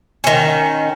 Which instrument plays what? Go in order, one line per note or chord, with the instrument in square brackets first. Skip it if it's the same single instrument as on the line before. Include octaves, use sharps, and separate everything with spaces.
[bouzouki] D#3 C#4